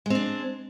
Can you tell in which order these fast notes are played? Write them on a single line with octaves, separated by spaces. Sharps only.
G#3 C4 D4